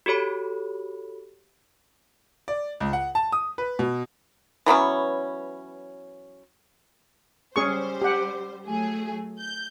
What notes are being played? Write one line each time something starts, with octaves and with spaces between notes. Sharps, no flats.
F#4 G4 A4 C#5 B5
D5
C#2
F#5
A5
D#6
B4
B2
E3 F#3 B3 C#4
G3 C#4 G#4 C5 C#6
G4 F#5
F#3 A3 G#4
G6